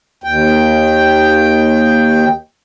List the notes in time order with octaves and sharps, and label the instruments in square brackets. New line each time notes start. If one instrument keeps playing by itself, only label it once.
[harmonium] D#2 G5